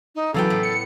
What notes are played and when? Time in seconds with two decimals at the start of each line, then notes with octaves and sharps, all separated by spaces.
0.15 D#4
0.34 C#3 E3 F#3 A#3 B3 A4 G5
0.50 A2
0.63 C#7